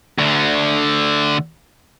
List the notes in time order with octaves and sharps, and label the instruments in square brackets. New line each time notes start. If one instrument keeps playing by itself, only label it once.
[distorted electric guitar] D2 D3